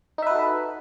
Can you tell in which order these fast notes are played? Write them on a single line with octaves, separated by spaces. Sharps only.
D#4 E5 B4 F#4 A4